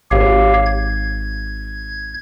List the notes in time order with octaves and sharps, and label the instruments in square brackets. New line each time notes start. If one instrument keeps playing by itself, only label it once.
[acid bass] G#1 [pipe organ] G4 C#5 F5
[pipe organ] G#6